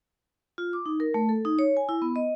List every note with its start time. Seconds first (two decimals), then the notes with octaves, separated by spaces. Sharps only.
0.58 F4
0.73 D6
0.86 D#4
1.00 A#4
1.14 A3
1.29 A4
1.45 D#4
1.59 C#5
1.77 G#5
1.89 E4
2.02 B3
2.16 D#5